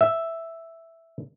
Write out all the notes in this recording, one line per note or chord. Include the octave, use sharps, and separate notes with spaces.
E5